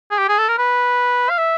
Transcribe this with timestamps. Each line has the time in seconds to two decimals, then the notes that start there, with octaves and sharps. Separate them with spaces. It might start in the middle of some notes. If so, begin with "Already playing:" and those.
0.11 G#4
0.18 G4
0.28 G#4
0.38 A4
0.48 A#4
0.58 B4
1.29 F5
1.38 E5